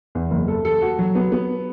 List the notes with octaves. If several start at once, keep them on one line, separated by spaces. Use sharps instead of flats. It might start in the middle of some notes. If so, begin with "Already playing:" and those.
E2
F#1
A4
A4
F#4
F#3
B3
B3